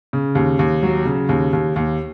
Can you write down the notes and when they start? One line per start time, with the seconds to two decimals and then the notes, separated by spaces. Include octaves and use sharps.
0.13 C#3
0.35 D#2
0.59 D#2
0.83 F#3
1.05 C#3
1.29 D#2
1.53 D#2
1.76 D#2